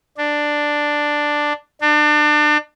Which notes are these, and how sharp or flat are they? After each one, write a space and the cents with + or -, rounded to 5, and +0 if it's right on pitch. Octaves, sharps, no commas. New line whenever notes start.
D4 +5
D4 +30